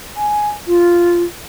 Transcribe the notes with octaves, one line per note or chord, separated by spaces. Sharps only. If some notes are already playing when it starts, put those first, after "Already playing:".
G#5
F4